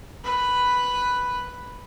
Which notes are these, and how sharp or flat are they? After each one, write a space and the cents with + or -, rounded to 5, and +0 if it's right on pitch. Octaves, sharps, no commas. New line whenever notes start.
B4 +0 B5 +0